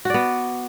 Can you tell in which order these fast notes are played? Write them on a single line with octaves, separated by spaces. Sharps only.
F#4 D5 B3